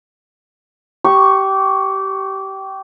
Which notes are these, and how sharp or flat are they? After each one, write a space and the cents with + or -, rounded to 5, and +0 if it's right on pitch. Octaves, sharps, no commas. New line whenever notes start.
G4 -20 C#6 +0